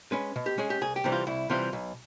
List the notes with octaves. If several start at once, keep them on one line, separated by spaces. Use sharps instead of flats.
G#3 C#4 B4
B2
G4
G#3 C#4 G#4
G4
C2 G#4
G4
C3 E3 G3 C4
F4
C2 E4
C3 E3 G3 C4 F4
B1